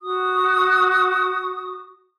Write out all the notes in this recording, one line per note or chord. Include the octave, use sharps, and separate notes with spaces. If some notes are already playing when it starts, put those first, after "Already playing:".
F#4 D#6